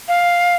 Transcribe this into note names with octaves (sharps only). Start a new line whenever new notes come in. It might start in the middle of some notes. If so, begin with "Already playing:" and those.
F5